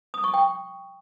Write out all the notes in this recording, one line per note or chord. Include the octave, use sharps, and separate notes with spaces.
D#6
C#6
G5